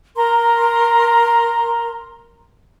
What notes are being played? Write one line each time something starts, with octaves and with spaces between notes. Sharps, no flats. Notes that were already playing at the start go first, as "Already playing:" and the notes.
A#4 A#5 C6